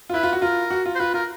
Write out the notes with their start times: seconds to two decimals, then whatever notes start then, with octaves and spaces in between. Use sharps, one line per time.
0.10 F4
0.14 E4 B4
0.23 F4
0.33 F#4
0.42 F4 A#4
0.71 F#4
0.86 F4
0.95 C5
1.00 F4 B4
1.14 F4 A#4